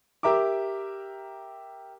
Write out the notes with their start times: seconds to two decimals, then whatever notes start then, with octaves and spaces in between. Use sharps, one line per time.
0.23 G4 A#4 E5 A#5 D6